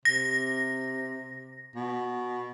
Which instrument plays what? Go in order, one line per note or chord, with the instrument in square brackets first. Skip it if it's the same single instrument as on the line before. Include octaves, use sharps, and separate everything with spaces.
[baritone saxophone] C3 [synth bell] A#6
[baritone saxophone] B2